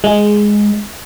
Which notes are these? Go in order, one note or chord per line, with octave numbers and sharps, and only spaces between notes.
G#3